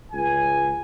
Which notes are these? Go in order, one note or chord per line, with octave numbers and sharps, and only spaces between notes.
C#2 G#5